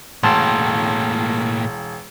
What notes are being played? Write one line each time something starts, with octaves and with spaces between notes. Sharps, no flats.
E1 A2 A#3 A5 C6